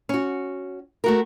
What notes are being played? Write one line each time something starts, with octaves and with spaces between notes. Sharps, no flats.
C#4 F#4
A3 F#4 A#4